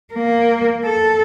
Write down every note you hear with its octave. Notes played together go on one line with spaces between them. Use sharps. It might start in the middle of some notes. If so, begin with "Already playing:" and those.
A#3
A4